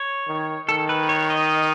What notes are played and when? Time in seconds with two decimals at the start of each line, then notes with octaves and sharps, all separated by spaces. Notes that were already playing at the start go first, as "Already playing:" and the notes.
Already playing: C#5
0.27 D#3
0.68 D#3 A4
0.89 B4
1.09 C#5
1.30 D#5